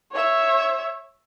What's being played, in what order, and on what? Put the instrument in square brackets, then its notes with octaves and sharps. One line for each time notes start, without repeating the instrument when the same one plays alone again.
[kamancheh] C#5 E5